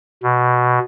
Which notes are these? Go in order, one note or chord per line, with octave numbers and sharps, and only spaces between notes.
B2